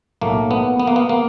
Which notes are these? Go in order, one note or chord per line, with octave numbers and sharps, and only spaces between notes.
B1 A2 F#3 A3 A#3
B3
B3
A#3
B3
A#3